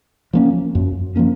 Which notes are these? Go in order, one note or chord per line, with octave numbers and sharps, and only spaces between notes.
F3 A#3 C#4
F#2
F3 A#3 C#4